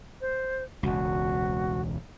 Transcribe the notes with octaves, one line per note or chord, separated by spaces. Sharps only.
C5
E1 C#2 F#4